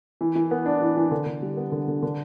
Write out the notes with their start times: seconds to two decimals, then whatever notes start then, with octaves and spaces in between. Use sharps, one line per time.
0.21 E3
0.35 E3
0.51 B3
0.66 D4
0.81 E3
0.97 E3
1.11 D3
1.26 D3
1.42 G3
1.57 B3
1.72 D3
1.88 D3
2.03 D3